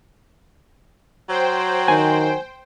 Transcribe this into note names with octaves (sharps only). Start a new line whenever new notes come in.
F#3 C5 G5
D#3 G#5